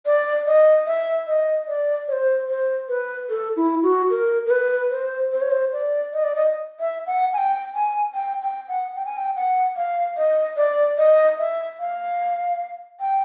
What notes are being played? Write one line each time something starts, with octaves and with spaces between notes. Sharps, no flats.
D5
D#5
E5
D#5
D5
C#5
C5
C5
B4
A4
E4
F#4
A#4
A#4
B4
C5
C5
C#5
C5
D5
D#5
D5
D#5
E5
F#5
G#5
G5
G#5
G5
G5
F#5
G5
G#5
G5
F#5
F5
D#5
D5
D#5
E5
F5
G5